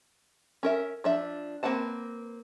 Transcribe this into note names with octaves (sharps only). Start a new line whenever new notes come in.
C#4 A#4 E5
F3 D4 E5
A#3 C4 B4 F#5 A5